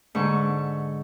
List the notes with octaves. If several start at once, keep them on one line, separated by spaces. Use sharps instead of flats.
G#2 D3 C#6